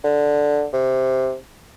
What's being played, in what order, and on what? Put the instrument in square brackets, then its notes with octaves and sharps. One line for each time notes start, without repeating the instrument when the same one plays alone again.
[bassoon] D3
C3